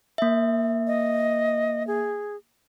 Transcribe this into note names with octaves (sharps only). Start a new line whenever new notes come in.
A#3 E5
D#5
G#4